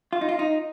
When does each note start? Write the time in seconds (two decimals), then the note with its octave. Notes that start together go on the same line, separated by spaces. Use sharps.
0.13 F4
0.21 D#4
0.29 F4
0.39 D#4